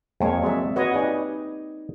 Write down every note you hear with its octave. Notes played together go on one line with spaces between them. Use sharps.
F2 G#3 A#3 C#5
F#3 G#3 C4 D5 E5
F#4 B4 C#5 D#5
D#4 G4 B4 D5 G#5